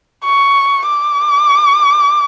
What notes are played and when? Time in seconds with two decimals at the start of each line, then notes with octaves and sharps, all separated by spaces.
0.24 C#6
0.87 D6